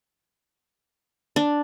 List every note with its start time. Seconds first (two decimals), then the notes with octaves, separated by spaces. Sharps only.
1.36 D4